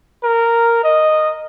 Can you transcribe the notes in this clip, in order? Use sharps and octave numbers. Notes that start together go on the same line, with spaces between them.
A#4
D#5